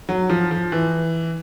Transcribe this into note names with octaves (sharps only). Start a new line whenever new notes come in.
F#3
F3
F3
E3